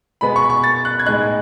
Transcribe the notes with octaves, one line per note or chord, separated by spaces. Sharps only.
B2 G#3 B3 B5
C#6
C#6
A6
F#6
G#6
A2 G#3 D#4 F#6